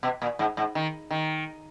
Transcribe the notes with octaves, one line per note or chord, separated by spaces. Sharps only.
B2
A#2
G#2
G#2
D#3
D#3